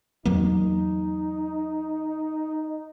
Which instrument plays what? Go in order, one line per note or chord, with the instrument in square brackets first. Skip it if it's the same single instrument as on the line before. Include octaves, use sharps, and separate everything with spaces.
[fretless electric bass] E2 F#3 A#3 [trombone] D#4